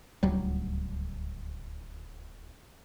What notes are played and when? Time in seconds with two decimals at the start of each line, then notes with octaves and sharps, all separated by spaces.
0.23 D1 C#2 F#3 G3